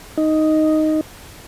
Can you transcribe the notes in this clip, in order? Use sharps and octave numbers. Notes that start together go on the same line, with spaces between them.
D#4